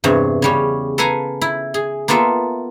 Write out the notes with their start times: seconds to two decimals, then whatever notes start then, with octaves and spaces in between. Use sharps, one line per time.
0.04 E2 G2 C3 C#5
0.42 C#3 G3 C#4
0.98 A4 B4 F5 G#5 A#5
1.41 E4
1.74 G#4
2.08 A#3 B3 F4 A4 E5